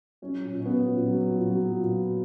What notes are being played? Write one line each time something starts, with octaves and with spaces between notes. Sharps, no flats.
F#3 C#4
A#2
C#4
F#3 B3
A#2
F#3
A#2
F#3
A#2